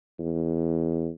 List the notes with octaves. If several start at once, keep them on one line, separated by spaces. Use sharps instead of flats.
E2